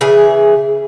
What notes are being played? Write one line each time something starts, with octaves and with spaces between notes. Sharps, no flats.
C#3 E3 G#4